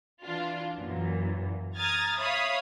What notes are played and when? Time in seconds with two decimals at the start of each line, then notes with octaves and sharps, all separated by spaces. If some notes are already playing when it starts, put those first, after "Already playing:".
0.25 E3 D4 F4
0.75 F#2 A#2 E3
1.77 A#5 D#6 F6 G#6 A6
2.18 C#5 E5 F5 B5 D#6